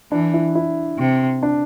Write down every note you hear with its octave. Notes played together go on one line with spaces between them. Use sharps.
E3 D4
E4
E4
C3
D4